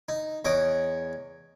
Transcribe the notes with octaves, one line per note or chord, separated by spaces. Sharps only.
D#4
E2 C#5 D#5 D6